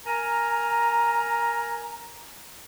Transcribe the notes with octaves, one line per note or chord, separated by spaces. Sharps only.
A#4 G#5 A#5